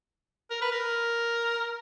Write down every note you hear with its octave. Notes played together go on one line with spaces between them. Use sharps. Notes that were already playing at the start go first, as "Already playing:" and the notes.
A#4
B4
A#4